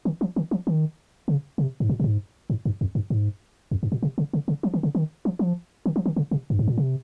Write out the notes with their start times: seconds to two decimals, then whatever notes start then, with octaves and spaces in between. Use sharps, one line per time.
0.05 D#3
0.21 F3
0.36 D#3
0.51 F3
0.67 D#3
1.28 C#3
1.58 C3
1.80 G#2
1.89 A#2
2.00 A#2
2.04 G#2
2.50 G#2
2.65 G2
2.81 F2
2.95 G2
3.10 G#2
3.71 F2
3.83 G2
3.92 A#2
4.03 C3
4.18 C#3
4.33 C#3
4.48 C#3
4.63 F3
4.74 D#3
4.83 C#3
4.95 D#3
5.25 F3
5.39 F3
5.86 D#3
5.96 F3
6.06 D#3
6.16 C#3
6.31 C3
6.50 G2
6.59 G#2
6.68 A#2
6.78 C3